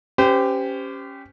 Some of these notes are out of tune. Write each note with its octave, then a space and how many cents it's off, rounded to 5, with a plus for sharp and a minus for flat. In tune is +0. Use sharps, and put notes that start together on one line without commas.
C#4 +0 G4 +0 C5 -40